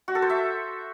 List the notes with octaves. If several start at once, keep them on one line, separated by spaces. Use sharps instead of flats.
F#4
A4
C5
E5